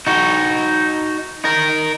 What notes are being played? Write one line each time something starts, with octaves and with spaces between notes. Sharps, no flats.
D#4 F#4
D#4 A#4